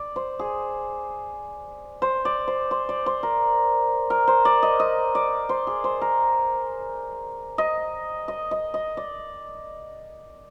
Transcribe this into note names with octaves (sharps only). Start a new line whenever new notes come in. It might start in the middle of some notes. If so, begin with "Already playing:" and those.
Already playing: D5
C5
G#4
C5
D5
C5
C5
D5
C5
A#4
A#4
C5
D5
D#5
D#5
D5
C5
G#4
C5
A#4
D#5
D#5
D#5
D#5
D5